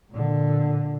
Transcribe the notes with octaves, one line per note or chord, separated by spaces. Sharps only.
A#2 D3